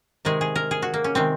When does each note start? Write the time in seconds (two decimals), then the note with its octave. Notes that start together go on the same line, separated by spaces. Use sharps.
0.25 C3 D#3 G#3 G#4
0.41 G#4
0.56 A#4
0.71 G#4
0.82 F#4
0.94 A#3
1.04 C#4
1.15 C3 D#3 G#3 C4